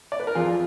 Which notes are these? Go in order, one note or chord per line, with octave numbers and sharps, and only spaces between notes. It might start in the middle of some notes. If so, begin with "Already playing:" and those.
D5
B4
A#4
F2 F4 G#4